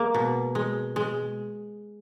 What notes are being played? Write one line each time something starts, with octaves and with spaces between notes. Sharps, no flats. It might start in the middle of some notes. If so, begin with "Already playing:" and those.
Already playing: G#3 A#3
B2
G#3
G#3